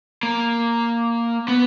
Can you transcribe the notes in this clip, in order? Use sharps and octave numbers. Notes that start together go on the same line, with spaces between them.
A#3
B3